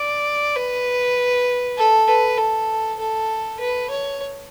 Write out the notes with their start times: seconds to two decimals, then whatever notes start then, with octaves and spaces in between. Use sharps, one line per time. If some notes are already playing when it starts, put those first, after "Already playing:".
Already playing: D5
0.56 B4
1.77 A4
2.08 B4
2.38 A4
2.99 A4
3.60 B4
3.90 C#5